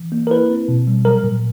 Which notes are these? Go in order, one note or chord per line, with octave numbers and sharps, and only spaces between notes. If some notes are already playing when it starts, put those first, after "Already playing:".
Already playing: E3
A#3
A#4
E4 B4
C4
B2
G3
F#3 A#4
A#2